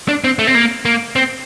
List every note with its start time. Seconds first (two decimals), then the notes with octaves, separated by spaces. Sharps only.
0.08 D4
0.24 C4
0.39 A3
0.47 C4
0.55 A#3
0.85 A#3
1.16 C4